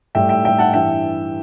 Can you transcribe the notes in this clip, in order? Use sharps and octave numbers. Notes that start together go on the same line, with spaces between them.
A2 G3 E5 G5
E5 G5
A2 G3 E5 G5
F#5 A5
G2 E3 G3 E5 G5